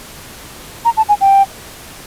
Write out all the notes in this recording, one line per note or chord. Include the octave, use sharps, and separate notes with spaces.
A#5
A5
G#5
G5